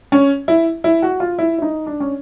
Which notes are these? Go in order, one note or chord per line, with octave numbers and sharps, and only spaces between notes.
C#4
E4
E4
F#4
F4
E4
E4
D#4
D4
C#4